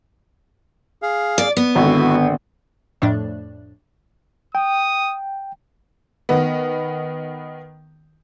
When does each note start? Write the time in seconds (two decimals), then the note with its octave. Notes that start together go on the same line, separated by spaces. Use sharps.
1.02 G#4 F5
1.38 D5
1.57 B3
1.75 G#1 D3 E4 F#4
3.02 F2 A2 D4
4.55 G5 D#6
6.29 D#3 B3